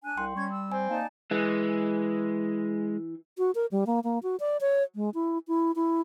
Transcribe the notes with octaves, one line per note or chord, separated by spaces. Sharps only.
D4 G#5 F#6
C2 G5 C6
G3 C#4 C#6 G#6
E6
C4 G#5
A#3 D#4 D5 A5
E3 G#3
F#4
A#4
G3
A#3
A#3
F#4
D5
C#5
G#3
E4
E4
E4